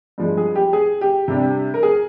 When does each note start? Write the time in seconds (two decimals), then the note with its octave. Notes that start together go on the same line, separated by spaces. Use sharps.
0.18 G2 F3 G#3
0.37 G#4
0.55 G4
0.73 G#4
1.01 G4
1.28 C3 G3 D4
1.74 A#4
1.83 G#4